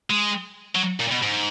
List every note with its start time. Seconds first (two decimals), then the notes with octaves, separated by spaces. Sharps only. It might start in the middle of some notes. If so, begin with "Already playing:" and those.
0.10 G#3
0.75 F#3
1.00 A#2
1.12 B2
1.23 G#2